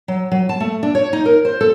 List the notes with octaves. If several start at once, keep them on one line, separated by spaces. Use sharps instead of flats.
F#3
F#3
A5
A3
D4
C#5
D#4
A#4
C5
A4